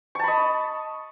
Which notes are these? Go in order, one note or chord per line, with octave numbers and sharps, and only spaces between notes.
D#5 A5 B5 C#6